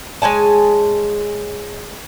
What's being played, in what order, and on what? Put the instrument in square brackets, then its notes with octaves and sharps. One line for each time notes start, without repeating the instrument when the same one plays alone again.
[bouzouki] G#3 C#5 G#5 A5